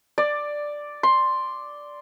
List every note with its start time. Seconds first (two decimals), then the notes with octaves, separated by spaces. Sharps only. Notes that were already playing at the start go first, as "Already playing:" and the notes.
0.18 D5
1.03 C6